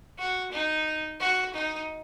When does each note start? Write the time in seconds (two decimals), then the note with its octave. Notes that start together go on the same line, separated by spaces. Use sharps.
0.18 F#4
0.52 D#4
1.20 F#4
1.54 D#4